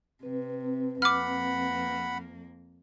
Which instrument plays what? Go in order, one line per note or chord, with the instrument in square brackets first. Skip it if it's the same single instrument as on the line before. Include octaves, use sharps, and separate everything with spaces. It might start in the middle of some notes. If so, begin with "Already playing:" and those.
[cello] C3 [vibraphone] C4 B4
[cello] F2 A#3 [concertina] F#5 B5 [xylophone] D6 F6